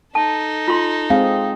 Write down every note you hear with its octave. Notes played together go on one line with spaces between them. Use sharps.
D#4 A4 A5
F4 C6
G#3 C4 G#4 F5